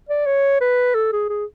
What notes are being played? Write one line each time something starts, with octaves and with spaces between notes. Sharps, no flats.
D5
C#5
B4
A4
G#4
G#4